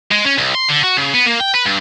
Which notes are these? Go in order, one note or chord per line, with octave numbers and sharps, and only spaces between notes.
G#3
C#4
C2
C6
D3
F#4
C#3
B3
A#3
G5
B4
G2